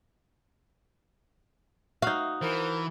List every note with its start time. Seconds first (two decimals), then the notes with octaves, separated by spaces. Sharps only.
2.02 D#4 F#4 F5
2.41 E3 A#4 C5